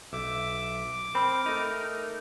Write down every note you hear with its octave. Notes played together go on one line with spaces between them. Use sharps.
B1 E5 D6
C4 A#4 B5 E6
A3 D#4